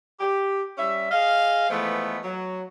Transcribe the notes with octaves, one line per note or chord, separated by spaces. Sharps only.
G4
G3 C#4 E5
G#4 D#5 F5
E3 F3 G#3 A3 B3
F#3